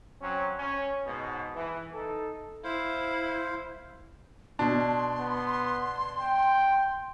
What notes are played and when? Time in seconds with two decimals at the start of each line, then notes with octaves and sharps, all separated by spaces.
0.21 F#3 C4 C#4
0.59 C#4
1.05 G#2 B2
1.55 E3
1.94 D#4 A4
2.64 E4 C5 F5
4.59 B2 D4 C6
5.20 B3
6.19 G5